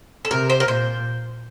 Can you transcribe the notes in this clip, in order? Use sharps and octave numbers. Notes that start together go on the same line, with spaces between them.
A4
C3 A#4
C5
A#4
A#2 C5